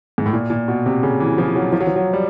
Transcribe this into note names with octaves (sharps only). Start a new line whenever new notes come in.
G#2
A2
A#2
A#2
B2
C3
C#3
E3
F3
F#3
F3
F#3
F3
F#3
G3